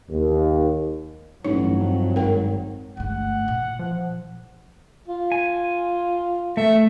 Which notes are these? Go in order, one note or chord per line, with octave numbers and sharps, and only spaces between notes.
D#2
A1 G2 F#3 D#4 C#5
F2
G#1 A#4 G5
G1 A3 F#5
A#2 E4
F3
F4
G#5
A3 E5